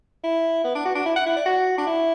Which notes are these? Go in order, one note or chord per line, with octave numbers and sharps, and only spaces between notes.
E4
B3
D4
F#4
D4
E4
F#5
E4
D5
F#4
D4
E4